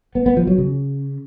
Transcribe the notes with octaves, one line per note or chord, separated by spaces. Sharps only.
B3
B3
F3
F#3
C#3